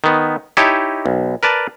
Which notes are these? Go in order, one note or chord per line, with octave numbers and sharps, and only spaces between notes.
D#3 B3
D#4 E4 G4 C#5 D#5 A5
B1
A#4 B4 D5 A5